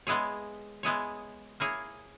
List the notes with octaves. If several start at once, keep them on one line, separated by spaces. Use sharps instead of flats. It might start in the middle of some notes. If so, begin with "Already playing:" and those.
G#3 B3 E4 G#4 C#5
G#3 B3 E4 G#4 C#5
A#3 E4 G#4 C#5